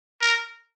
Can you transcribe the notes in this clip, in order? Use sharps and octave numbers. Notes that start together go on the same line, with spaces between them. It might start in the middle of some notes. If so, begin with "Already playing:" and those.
A#4